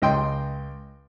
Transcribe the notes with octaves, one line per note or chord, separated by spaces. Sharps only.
C#2 D#5 G5 C6